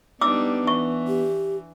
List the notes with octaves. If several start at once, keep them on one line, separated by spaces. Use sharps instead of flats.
G3 B3 D4 D#4 D6 E6
E3 C#6
G4